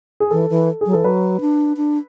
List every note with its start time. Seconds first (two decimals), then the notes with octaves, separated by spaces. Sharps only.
0.20 G#4
0.31 E3 A4
0.50 E3
0.81 F#3 G#4
0.93 E3 A4
1.04 F#3 B4
1.41 D4
1.77 D4